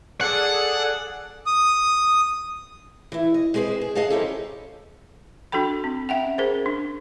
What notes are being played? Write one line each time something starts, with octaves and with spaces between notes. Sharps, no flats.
G#4 A4 D5 F#5
D#6
E3 E4
D#5
G#3 C4 G#4 B4 C5
G#4
G#4 D#5 F5 F#5 A5
F3 C#4 D#4 E4 G4 A4
D4 F#4 A4 G5 B5
C4
C#4 E5 F#5 G5
C#4 G#4 A#4 C5
D4